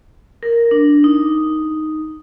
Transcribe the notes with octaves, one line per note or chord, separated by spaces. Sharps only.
A#4
D4
D#4